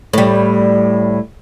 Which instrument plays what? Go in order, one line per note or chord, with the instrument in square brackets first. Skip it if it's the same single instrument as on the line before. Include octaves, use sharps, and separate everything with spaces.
[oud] A2 G3